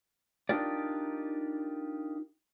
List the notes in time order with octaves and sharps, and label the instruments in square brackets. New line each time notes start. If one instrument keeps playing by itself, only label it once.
[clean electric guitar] D4 D#4 F4 G4 A#4 D5